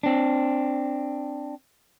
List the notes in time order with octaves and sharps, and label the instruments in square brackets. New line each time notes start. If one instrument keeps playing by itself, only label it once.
[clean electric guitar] C4 D4